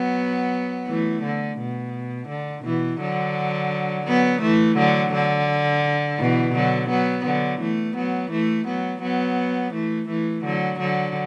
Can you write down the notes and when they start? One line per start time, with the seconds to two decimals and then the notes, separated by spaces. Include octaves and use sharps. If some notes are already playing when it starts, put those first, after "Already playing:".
Already playing: F#3 B3
0.87 E3 A3
1.23 D3
1.59 B2
2.29 D3
2.64 B2 E3
3.01 D3 F#3
4.07 F#3 B3
4.42 E3 A3
4.78 D3 F#3
5.14 D3
6.19 B2 E3
6.55 D3 F#3
6.90 F#3 B3
7.25 D3 F#3
7.61 E3 A3
7.97 F#3 B3
8.31 E3 A3
8.67 F#3 B3
9.02 F#3 B3
9.74 E3 A3
10.09 E3 A3
10.45 D3 F#3
10.80 D3 F#3